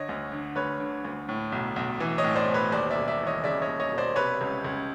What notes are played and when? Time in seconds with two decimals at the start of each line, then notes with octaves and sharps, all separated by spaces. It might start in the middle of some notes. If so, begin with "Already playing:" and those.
Already playing: D3 C#5 D#5
0.09 D2
0.32 D3
0.56 D2 B4 C#5
0.80 D3
1.05 D2
1.29 A2
1.52 B1
1.76 B1
2.00 E3
2.18 C#5 D#5
2.24 A2
2.36 C5 D5
2.48 B1
2.54 B4 C#5
2.72 D#2 C5 D5
2.91 D5 E5
2.96 E1
3.08 D5 E5
3.20 E3
3.27 C#5 D#5
3.44 C#3 D5 E5
3.62 C#5 D#5
3.68 D#2
3.80 C#5 D#5
3.92 E1
3.98 C5 D5
4.16 C3 B4 C#5
4.41 C#2
4.64 C#2